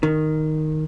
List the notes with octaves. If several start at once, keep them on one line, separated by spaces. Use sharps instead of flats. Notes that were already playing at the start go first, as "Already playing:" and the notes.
D#3